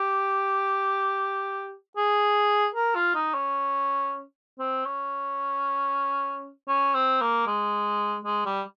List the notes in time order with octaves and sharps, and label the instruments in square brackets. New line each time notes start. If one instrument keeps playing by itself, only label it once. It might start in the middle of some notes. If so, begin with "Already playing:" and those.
Already playing: [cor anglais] G4
G#4
A#4
F4
D#4
C#4
C4
C#4
C#4
C4
A#3
G#3
G#3
G3